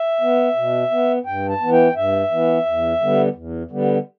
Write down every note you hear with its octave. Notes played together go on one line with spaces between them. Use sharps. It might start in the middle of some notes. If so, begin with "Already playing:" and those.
Already playing: E5
B3
B2
B3
G2 G5
A5
E3 B3
G5
G2 E5
E3 B3
E2
D3 G3 B3
E2
D3 G3 B3